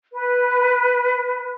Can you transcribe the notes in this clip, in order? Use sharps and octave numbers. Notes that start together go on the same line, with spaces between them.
B4